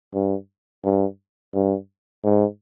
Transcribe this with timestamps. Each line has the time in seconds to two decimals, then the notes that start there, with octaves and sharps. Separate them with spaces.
0.14 G2
0.84 G2
1.54 G2
2.24 G#2